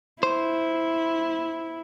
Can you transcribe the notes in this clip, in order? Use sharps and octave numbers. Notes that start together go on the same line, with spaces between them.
E4 C5